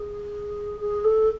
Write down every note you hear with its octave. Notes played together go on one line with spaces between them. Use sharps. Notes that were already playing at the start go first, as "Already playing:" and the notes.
Already playing: G#4
G#4
A4